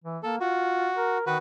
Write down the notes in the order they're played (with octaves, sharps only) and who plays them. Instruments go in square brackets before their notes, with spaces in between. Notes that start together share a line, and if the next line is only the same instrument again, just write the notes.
[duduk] E3
[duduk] A#3 [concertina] A4
[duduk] F4 [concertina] F#4
[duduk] A#4
[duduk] D#3 [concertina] F#4 B4